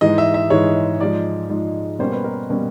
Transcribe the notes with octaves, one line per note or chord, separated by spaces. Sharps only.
G#2 E3 G#3 D#5
E5
E5
G#2 E3 G#3 C#5
G#2 F3 G#3 D5
G#2 F3 G#3
B2 G3 A#3 C#4 C5
B4
A#4
B2 G3 A#3 C#4